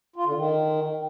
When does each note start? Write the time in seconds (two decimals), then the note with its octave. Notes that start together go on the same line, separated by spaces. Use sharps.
0.16 F4
0.26 D3
0.35 D#3